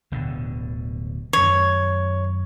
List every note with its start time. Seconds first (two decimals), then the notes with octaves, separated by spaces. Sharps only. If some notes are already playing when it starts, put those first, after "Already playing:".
0.12 D1 B2 D3
1.33 F#2 D#3 C#5